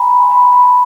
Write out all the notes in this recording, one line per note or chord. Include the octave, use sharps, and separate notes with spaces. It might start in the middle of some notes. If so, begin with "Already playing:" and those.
Already playing: G#5 A#5 B5
B5
C6
B5
C6
B5
A5